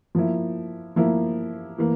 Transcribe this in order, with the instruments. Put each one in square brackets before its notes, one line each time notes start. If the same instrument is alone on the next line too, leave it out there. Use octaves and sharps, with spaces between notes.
[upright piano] F3 A#3 E4
F3 A#3 E4
E3 A#3